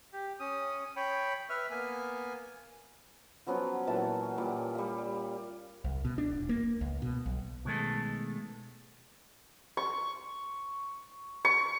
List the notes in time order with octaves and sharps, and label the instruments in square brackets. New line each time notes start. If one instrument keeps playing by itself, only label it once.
[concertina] G4
C#4 D#6
C#5 G5 B5
B4 E5 F6
A#3 B3 G#5
[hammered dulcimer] F3 F#3 B3 C#4
A#2 E3 F#3 A5
A#2 G3
G3 F5
[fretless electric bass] C2
B2
D4
D#1
A#3
C#2
B2
B1
[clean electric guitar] B2 D#3 G#3 A3 A4
[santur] C#6
C#6